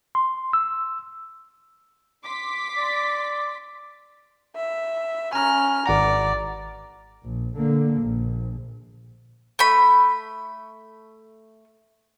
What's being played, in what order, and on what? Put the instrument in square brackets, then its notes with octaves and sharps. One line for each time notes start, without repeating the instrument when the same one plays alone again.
[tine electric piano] C6
E6
[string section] C6 D6 B6
[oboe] D5
[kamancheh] E5
[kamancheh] C#4 F6 [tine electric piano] G#5 A#5
[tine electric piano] G#1 F#5 A#5 [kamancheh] D5
[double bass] A#1
D3 A#3
A#1
[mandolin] A3 B5